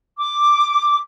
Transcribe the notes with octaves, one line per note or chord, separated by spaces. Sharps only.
D6